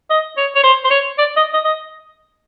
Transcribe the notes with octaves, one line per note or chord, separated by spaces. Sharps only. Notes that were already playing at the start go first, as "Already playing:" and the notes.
D#5
C#5
C#5
C5
C5
C#5
D5
D#5
D#5
D#5